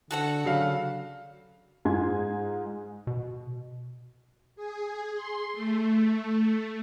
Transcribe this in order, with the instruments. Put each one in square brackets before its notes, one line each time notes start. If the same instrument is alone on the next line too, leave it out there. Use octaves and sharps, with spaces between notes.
[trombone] D3 [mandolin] F#4 A4 F#5
[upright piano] C#3 F#3 F5
[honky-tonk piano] G#2 F4 G#5 C6 G#6
[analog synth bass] B2
[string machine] G#4
C6
A3